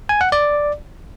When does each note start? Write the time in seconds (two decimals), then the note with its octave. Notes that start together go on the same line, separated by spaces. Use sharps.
0.09 G#5
0.21 F#5
0.32 D5